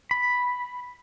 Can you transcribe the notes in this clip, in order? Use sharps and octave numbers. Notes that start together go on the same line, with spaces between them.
B5